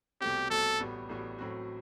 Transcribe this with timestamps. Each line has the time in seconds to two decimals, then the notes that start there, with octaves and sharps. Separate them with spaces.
0.21 C2 B2 A3 C4 G4
0.50 C2 B2 A3 C4 A4
0.80 A1 A2 G3 B3 F#4
1.09 A1 A2 G3 B3 F#4
1.39 A1 A2 F#3 C4 F#4